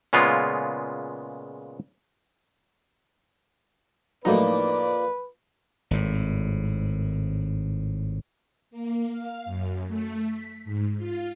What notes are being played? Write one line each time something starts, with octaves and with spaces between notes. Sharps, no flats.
A#2 C#3 G#3 B3 F4
F2 A2 F3 F#3 A#3 D#4 B4 D5
G#1 A2
A#3
F5
F#2
A3
B6
G#2
F4